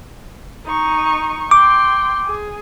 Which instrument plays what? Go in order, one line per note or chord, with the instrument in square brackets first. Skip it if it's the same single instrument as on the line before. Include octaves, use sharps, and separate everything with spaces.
[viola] D#4 C#6
[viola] G5 C6 [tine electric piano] D6
[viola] G#4